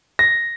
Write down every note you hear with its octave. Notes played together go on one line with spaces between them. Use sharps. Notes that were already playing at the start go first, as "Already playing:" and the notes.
A#6